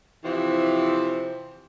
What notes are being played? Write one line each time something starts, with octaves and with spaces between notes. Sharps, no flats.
C3 E3 F3 C5